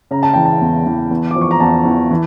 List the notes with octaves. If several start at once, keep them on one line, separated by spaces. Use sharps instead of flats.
C#3 A#5
A5
E3 G5
A5
E2
E3
E2
F3 D6
C#6
A#5
E2 A5
E2
E3